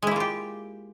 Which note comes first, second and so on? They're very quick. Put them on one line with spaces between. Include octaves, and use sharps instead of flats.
G#3 E4 A#3 F4 G4